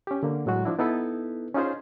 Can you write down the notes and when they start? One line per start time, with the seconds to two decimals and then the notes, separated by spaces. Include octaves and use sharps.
0.07 C#4 G4
0.23 D3 A#3
0.46 A2 F#3 G#3 F#4
0.65 F3 D4 E4
0.79 B3 D#4 E4 A4 B4
1.55 C#4 D#4 F4 G#4 C5